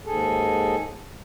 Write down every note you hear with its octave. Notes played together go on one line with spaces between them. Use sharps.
D#2 G#2 G#4 A4